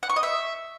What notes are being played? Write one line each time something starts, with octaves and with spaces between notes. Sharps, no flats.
F#5
C#6
D#5
E5